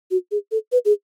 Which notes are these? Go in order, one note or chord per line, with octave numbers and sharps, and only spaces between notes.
F#4
G#4
A4
B4
G#4